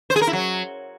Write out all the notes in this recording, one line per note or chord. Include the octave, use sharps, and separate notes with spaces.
C5
G#4
A#4
E4
F#3